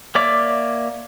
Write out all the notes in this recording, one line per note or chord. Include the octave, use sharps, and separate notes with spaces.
A#3 C#5 D5 E5 D6